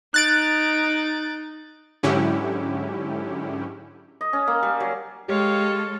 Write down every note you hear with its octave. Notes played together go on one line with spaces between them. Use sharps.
D#4 F#6 A6 D7
G#2 D3 F#3 C#4 E4 G4
D#5
C#4
A#3
G3
F#3
G#3 G4 A4 C#5 F5